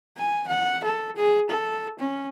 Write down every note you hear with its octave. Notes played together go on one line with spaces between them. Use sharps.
G#5
F#5
A4
G#4
A4
C#4